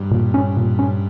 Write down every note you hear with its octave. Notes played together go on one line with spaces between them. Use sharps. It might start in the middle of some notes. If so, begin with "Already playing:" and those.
Already playing: G2
A#2
C#4
A#2
C#4